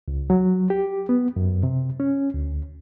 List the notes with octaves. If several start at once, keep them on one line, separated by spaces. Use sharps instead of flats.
C#2
F#3
G4
B3
F#2
C3
C#4
D2